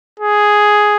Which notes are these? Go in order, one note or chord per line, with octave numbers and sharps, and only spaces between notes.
G#4